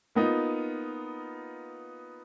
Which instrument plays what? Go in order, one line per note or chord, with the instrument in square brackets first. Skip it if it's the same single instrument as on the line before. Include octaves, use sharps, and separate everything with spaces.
[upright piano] A#3 B3 D#4 F4